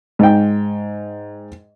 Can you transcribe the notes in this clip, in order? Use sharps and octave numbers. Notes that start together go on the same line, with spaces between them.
G#2 G5